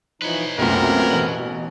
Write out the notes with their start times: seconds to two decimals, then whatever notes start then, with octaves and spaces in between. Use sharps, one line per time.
0.22 E3 F3 D#4 B4 C#5
0.58 C2 F#2 A#2 A3 B3 C4 A#4
1.11 A1 B2 F#7